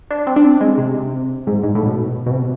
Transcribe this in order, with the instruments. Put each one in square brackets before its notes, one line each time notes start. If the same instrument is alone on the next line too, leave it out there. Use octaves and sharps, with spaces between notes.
[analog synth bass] D4
C4
D4
C4
G#3
C3
G#2
G#2
A2
B2
B2
C3